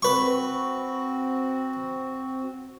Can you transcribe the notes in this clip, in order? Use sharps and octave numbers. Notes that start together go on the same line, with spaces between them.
C4 F#4 B4 C#6